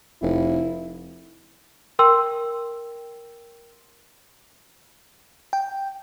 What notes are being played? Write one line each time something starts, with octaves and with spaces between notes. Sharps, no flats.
F1 E4
A#4 G5 C6 E6
G5